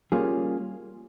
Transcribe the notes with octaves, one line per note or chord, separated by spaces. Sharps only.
G3 A#3 C#4 F4 G#4